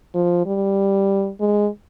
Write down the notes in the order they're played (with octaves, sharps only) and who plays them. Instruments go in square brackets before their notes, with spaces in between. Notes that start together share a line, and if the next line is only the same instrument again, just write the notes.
[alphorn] F3
G3
G#3